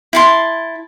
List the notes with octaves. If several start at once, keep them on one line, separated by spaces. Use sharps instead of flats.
E4 A5 C6